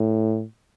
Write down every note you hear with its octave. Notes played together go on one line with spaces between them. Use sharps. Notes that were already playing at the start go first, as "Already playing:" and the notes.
Already playing: A2